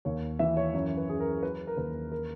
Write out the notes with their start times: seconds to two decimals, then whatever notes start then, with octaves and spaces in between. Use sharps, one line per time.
0.05 D#2 C#5
0.39 E3 E5
0.57 C#5
0.74 F#2 C#5
0.97 B4
1.08 F#2 G#4
1.20 A#4
1.43 F#3 B4
1.67 A#4
1.77 D#2 B4
2.12 A#4